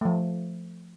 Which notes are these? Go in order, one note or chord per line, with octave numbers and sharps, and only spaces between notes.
F3 A3